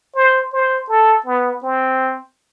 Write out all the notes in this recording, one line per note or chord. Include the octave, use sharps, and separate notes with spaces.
C5
C5
A4
B3
C4